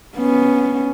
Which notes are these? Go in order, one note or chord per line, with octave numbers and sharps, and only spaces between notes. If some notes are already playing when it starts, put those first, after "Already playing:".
B3 C#4